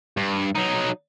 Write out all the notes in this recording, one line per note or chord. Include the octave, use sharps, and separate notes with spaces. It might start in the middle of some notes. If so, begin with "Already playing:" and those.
G2
F#3 D#4